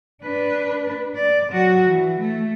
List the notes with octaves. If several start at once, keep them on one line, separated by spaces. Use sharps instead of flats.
D4 B4
D5
F#3 F#4
E3
A3